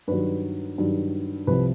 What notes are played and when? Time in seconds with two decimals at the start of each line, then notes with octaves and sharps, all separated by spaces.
0.08 G2 D#3 F#3 B4
0.78 G2 D#3 F#3
1.47 C2 C3 F3 B4